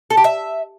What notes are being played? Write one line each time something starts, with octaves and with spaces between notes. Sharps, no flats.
A4
G4
E5